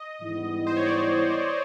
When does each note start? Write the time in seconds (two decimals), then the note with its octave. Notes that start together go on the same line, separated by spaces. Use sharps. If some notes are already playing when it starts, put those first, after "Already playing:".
Already playing: D#5
0.21 G#2 E3 G3 B3 E4
0.67 C5
0.77 C#5
0.86 D5